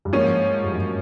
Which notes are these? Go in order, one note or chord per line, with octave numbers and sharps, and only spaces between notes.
G2
G#2 F3 A#3 C#4
G#2
G2
F#2